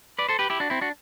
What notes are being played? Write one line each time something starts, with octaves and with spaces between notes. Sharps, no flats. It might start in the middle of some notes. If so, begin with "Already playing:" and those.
B4 D5
A4 C5
G4 B4
E4 G4
D4 F#4
C4 E4
D4 F#4